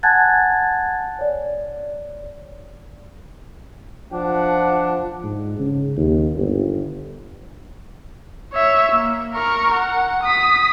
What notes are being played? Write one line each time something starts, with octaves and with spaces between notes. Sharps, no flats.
F#5 G#5 A5 F#6 G#6 A6
C#5 D5
F3 D4 F#5
G#2
C#3
D#2
G1
C#5 E5
A#3
A#4 C#6
F#5
D#6 B6